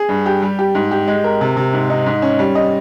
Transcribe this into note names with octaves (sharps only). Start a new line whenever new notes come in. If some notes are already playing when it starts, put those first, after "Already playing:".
Already playing: G#4
G2
G4
G3
G4
G#2
G4
G#3
A#4
C3
C3
G#2
D#4
G#2
C#4
G3
D#5